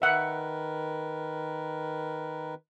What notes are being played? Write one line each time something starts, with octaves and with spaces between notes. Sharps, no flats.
D#3 A#4 B4 E5 F#5